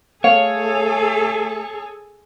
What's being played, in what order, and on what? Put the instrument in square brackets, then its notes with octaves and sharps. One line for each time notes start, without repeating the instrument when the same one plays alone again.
[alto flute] A3 [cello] G#4 A4 [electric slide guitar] C#5 [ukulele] F5